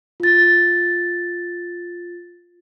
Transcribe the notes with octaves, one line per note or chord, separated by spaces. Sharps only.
F4 A6